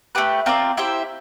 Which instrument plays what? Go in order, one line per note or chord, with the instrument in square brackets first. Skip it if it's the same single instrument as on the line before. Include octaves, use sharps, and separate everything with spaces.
[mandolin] A3 D4 G4 B4
C4 F4 A#4 D5
E4 G4 C5 E5